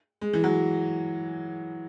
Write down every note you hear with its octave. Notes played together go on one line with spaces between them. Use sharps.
G#3
E3
F#3